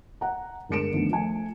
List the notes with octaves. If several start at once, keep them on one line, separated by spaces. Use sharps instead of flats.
F#5 A#5
G1 G#3 A#4 C#7 D7 E7
D3 D#3 F3 A3 B3
F3 A3 G#5